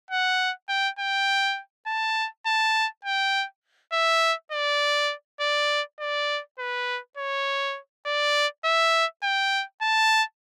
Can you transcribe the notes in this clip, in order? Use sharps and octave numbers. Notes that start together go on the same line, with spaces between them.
F#5
G5
G5
A5
A5
G5
E5
D5
D5
D5
B4
C#5
D5
E5
G5
A5